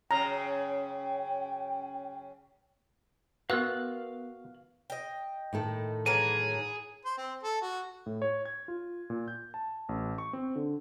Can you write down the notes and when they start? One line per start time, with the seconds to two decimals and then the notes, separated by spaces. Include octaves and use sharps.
0.11 F#2 C#3 G5 A#5
3.50 B3 F#4 A#4 B4 F5 F#6
4.90 D#5 G5
5.53 A2 D#3 A4
6.06 E3 F#3 G#4 A#4 D#7
7.05 C5
7.17 C4
7.43 A4
7.62 F#4
8.06 A2
8.22 C#5
8.45 G#6
8.68 F4
9.10 A#2
9.28 G6
9.54 A5
9.89 A1
10.18 C#6
10.33 C4
10.56 D3